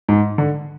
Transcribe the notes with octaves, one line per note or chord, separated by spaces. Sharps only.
G#2
D3